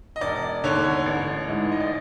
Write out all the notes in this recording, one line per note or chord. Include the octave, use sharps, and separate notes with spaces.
D#5
E1 D5
D#2 D3 C#5
C#5
A1
G#2 E3 G#3
D#5
D5